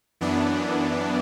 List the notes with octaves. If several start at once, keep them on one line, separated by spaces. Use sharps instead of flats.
F#2 E3 B3 D4